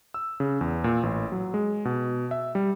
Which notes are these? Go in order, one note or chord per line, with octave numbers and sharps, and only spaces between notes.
E6
C#3
E2
A#2
A1
F#3
G#3
B2
E5
G3